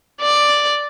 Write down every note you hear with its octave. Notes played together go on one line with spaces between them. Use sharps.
D5